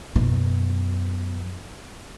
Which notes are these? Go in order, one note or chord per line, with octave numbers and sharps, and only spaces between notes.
F#2 B2